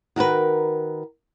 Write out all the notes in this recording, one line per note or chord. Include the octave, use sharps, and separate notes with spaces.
D#3 F#4 A#4 B4